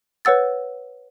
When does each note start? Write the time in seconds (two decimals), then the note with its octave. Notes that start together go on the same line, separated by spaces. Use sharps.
0.25 B4 C#5 F#5 E6 A6